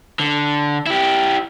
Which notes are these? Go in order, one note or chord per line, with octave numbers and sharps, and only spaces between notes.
D3
E4 G4